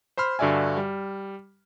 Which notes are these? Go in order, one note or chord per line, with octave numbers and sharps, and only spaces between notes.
C5 B5 C6 F6
G2 D3 F#4 D5 E5 G#5
G3